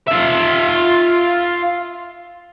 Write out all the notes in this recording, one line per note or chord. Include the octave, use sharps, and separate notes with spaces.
F4 E5